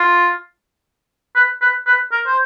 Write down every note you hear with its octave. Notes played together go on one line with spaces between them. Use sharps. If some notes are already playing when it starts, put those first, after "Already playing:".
Already playing: F4
B4
B4
B4
A#4
C5